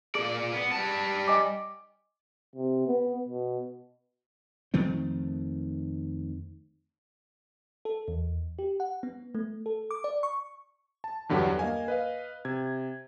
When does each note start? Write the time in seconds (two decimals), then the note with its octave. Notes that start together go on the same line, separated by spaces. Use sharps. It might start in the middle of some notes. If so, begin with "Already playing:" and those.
0.15 A#2 G#4 D5
0.53 B3
0.72 G3 A5
1.27 D#5 G#5 D6
2.55 C3
2.87 B3
3.28 B2
4.74 F2 D#3 A3 C4
7.85 A4
8.08 E2
8.59 G4
8.80 F#5
9.03 B3
9.35 A3
9.66 A4
9.91 D6
10.04 D5
10.23 C#6
11.04 A5
11.29 E2 G2 D3 F#3 G4 F#5
11.59 A#3 D#5 F5 G#5
11.88 B4 D#5 F5
12.45 C3 G#6